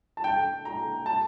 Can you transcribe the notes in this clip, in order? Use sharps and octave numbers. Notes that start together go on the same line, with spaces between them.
A5
G5
A#5
A5